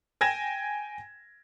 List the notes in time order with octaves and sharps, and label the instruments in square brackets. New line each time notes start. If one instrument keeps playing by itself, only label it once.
[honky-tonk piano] G5 G#5 G#6 A#6 E7